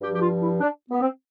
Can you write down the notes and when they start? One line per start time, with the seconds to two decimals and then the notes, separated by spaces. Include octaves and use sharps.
0.01 G2 G4
0.05 F3
0.13 G4
0.21 F4
0.41 E4
0.61 D4
0.91 B3
1.01 C4